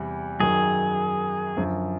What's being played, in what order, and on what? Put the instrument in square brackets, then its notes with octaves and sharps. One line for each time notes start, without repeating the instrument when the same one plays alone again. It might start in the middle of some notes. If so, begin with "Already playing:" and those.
Already playing: [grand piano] E2 C3 G3
[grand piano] F#2 D#3 F#3 [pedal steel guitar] G#4
[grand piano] F#2 D3 F3